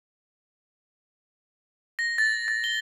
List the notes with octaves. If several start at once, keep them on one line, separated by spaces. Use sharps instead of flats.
A#6
A6
A6
G7